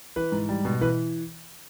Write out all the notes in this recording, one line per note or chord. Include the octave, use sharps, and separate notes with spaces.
E3 B4
G#2
G3
B2
E3 B4